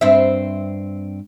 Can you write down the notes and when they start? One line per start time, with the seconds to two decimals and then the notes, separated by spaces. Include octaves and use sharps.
0.01 G2 C4 E5